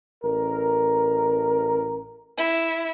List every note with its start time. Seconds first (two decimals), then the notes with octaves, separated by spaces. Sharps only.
0.24 A1 A#4
2.38 E4